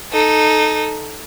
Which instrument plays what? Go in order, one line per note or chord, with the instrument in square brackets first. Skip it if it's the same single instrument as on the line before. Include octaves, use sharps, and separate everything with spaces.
[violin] D#4 A4